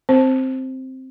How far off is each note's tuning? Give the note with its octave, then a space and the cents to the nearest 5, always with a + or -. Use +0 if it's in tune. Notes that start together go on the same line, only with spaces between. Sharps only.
C4 +0 C5 +10